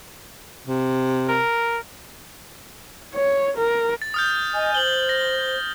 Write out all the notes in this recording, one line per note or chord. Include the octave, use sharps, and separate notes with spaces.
C3
A#4
C#5
A#4
A6
D#6 F6 G6
D#5 G#5
C5 F#7 G7
A#6